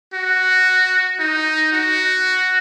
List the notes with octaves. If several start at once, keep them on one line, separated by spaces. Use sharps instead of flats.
F#4
D#4
F#4